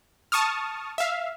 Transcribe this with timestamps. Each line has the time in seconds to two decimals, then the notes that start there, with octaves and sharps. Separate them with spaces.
0.32 A5 C#6 D#6 F6
0.98 E5 F5